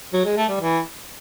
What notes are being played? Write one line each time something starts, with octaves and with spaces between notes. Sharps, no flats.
F#3
G#3
A3
G3
E3